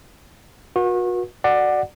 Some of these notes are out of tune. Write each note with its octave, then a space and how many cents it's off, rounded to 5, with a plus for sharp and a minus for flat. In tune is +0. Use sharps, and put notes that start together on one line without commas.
F#4 -35 B4 -45
F#4 +0 D5 +15 F#5 +0